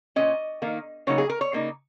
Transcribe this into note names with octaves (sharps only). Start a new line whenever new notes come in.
A#2 G#3 C#4 D#5
D#3 A#3 D#4
C#3 F#3 A#3 D#4 C#5
G#4
A#4
C#5
C#3 A#3 D#4